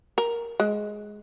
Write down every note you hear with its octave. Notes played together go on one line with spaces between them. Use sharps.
A#4
G#3